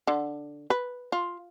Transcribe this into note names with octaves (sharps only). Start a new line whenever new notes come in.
D3
B4
F4